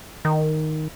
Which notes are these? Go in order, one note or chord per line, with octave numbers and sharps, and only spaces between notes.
D#3